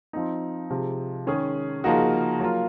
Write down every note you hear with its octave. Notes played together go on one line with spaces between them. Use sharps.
F3 C4 D#4
C3 F3 G#3
D#3 G#3 C#4 G#4
C#3 F3 A#3 D#4 F#4
F#3 A#3 F4